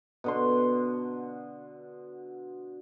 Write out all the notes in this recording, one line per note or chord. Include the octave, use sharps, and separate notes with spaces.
B2 D3 C6